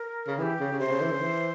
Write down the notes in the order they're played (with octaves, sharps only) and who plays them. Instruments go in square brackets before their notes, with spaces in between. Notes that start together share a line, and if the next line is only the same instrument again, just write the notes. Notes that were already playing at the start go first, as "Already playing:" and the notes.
Already playing: [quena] A#4
[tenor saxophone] C#3
[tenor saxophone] E3 [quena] G#4
[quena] G4
[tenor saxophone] C#3
C#3
[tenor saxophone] C3 [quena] C5
[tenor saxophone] C#3
E3
C#3
E3